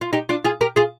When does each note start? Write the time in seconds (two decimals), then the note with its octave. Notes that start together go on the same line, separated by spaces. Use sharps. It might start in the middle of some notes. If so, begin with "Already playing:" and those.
0.01 F4
0.13 D#4 G4
0.29 D4 F4
0.45 F4 G#4
0.61 G4 A#4
0.76 F4 G#4